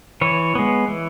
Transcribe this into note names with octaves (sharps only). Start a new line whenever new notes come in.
E3 C#5
G#3 B3
E3